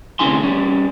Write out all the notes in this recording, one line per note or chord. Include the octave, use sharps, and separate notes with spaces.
D2 C3 C#4 E4 G#5 C6
G3 C#4